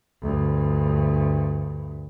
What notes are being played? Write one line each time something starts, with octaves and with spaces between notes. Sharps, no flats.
D2 G2